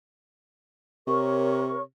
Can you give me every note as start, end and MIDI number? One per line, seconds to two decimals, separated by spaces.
1.07 1.82 48
1.07 1.80 70
1.07 1.80 73
1.07 1.80 85